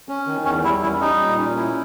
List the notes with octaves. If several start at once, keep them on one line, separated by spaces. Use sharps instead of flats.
C#4
D#3
E2 C#4
G3 E4
C#4 E4
G3 D#4
A#2
C#4
E4